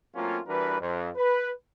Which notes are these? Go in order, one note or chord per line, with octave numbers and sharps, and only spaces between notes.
F#3 A3 A#3 C4 C#4 F4
E3 G3 D4 F#4 A#4 B4
F2
B4